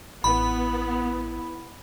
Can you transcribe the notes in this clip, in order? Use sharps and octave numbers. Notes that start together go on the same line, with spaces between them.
A1 B3 E4 B5